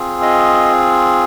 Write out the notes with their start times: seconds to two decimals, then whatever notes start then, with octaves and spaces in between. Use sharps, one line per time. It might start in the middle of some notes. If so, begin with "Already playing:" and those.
Already playing: C4 F4 G#4
0.22 D#5